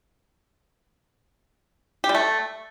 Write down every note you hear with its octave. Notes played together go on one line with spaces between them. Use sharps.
G4
G3
A3